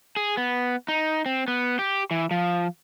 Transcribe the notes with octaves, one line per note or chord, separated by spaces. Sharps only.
G#4
B3
D#4
C4
B3
G4
E3
F3